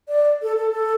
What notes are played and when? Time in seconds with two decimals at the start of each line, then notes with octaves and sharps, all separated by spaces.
0.08 D5
0.42 A4
0.56 A4
0.71 A4